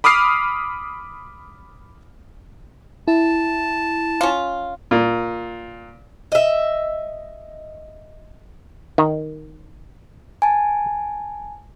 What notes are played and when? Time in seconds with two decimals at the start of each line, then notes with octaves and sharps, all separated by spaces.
0.04 B5 D6 D#6 F6 C7
3.08 E4 A5
4.21 C#4 F4
4.91 A#2
6.32 D#5 E5
8.98 D#3
10.42 G#5 A5